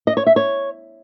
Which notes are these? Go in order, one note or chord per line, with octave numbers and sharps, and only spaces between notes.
D#5
C#5
E5
C#5